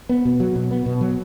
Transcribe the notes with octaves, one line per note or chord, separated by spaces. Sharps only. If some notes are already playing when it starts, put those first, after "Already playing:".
B3
B2
F#3
B2
B3
B2
F#3